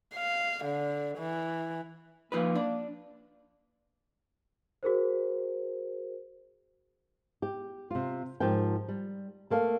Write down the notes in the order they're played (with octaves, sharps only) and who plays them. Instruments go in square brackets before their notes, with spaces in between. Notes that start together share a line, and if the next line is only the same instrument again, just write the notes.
[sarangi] F5
D3
E3
[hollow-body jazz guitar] F3 D#4 B4 [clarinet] A#3
[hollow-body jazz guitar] D4
[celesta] F#4 G#4 A#4 C5
[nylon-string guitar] G4
C3 F4
G#2 F3 G4 A#4 G5
G3
A3 A#3 A4 F5